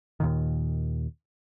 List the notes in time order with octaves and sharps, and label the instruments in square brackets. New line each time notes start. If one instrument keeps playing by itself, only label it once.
[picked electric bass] D#2 A#2 D#3